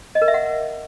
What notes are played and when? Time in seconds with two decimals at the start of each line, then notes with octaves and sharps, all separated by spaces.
0.15 D#5
0.22 A#4
0.28 E5
0.34 F#5